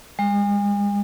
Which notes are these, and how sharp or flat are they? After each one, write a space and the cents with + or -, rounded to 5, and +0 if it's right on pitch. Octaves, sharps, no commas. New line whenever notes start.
G#3 -40